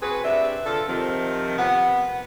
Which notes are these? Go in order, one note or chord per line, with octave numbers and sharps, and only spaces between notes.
C4 F#4 G#4 B4
C3 D4 B4 E5
D3 F4 A4
C3 D#3 F3 C4
C3 B3 F#5